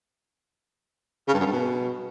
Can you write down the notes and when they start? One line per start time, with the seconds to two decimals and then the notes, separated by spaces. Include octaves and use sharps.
1.28 C#3
1.34 G2
1.40 F#2
1.46 G2
1.52 B2